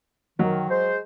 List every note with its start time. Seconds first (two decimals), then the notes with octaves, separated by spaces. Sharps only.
0.39 D#3 F#3
0.70 G#3 C5